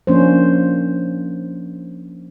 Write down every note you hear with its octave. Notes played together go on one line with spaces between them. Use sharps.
F3 A#3 C#4 D4 C5